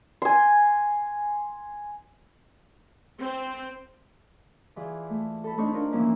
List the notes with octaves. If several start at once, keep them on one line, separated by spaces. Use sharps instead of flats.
G#5 C6
C4
E3 F4 G#4 D5
A3
A4 B5
A3 C4 D4 D#4 A4 C#5
D4 F4 A#4
E3 F3 A#3 C#4 D#4 E4